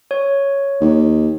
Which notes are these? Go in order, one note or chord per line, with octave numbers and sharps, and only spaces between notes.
C#5
D#2